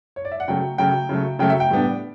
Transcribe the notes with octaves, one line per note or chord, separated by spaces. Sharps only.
C#5
D5
E5
F#5
C#3 F#3 A3 G5
C#3 F#3 A3 G5
C#3 F#3 A3
C#3 F#3 A3 G5
E5
G5
A2 G3 B3 D4